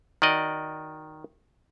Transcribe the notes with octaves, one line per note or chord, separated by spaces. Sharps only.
D#3 F#4 D5 D#5